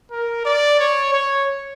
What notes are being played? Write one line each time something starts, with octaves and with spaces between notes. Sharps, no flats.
A#4
D5
C#5
C#5